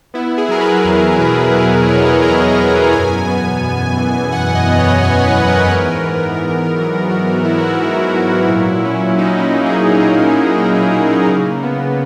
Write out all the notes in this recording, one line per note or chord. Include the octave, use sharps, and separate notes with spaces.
B3 E4
G#4
F#3 A#4
B4
E2 B4
B2 B4
B3 B4
F#3 C#5
D#5
C#5
E2 A#5
B2
F#2 G#5
B3
F#2
E3
F#2 F#5
D#5
B3
C#5
F#2 C#5
B4
E3
A#4
G#2
B3
G#2
F#3
G#2 F#4
B3 E4
F#4
E4
G#2
F#3
A#2
C#4
A#2 D#4
E4
A#3
G#4
A#2 A#4
C#4
A#2
A#3
C#3
B3